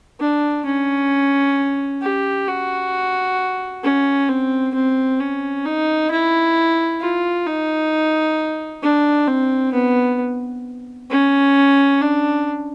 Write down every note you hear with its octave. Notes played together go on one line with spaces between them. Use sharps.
D4
C#4
G4
F#4
C#4
C4
C4
C#4
D#4
E4
F4
D#4
D4
C4
B3
C#4
D4